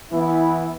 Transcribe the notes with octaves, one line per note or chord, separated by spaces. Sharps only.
E3 B3 E4